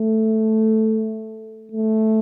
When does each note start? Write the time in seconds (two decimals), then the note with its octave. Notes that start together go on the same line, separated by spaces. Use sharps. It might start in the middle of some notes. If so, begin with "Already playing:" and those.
Already playing: A3
1.72 A3